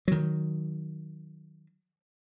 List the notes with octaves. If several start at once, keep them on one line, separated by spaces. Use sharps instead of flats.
D#3 F#3